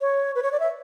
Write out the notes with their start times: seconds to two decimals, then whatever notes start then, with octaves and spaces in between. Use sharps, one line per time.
0.01 C#5
0.35 B4
0.43 C#5
0.52 D5
0.60 E5